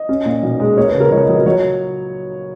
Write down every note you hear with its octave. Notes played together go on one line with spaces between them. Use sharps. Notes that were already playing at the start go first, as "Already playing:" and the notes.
Already playing: D#5
C#4
A#2
B1
G#3
A#3 C#5
B4
C#3
A#4
C#2 C#5
F#3 D#5
A#4
F#3 C#5